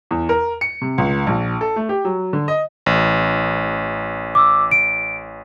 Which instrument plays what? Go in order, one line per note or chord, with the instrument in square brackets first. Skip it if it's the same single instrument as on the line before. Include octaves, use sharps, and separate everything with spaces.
[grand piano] E2
A#4
C#7
C3
C#2
A#1
A4
A3
G4
F#3
D3
D#5
[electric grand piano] A1
[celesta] D6 E6
D7